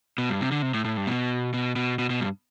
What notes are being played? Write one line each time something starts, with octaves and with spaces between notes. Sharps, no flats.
B2
G2
C3
D3
C3
A2
A2
G2
B2
B2
B2
B2
B2
G2